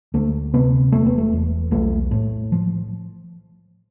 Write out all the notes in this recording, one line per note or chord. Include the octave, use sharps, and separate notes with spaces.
D2 A3
C3 B3
E1 A3
B3
A3
E2
B1 A3
A2
F3